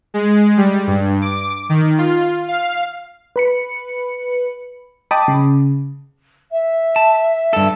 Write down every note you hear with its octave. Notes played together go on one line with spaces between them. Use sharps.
G#3
G3
G2
D6
D#3
F4
F5
B4 B5 C#7
D#5 G5 A5 B5 D6 D#6
C#3
E5
A5
G2 A4